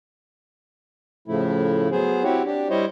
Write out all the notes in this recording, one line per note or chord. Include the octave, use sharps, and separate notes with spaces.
A2 C#3 F3 A3 E4
F#3 B3 G#4 C5
C4 E4 F#4 G4 C#5
D4 G4
G3 E4 C5 C#5 D#5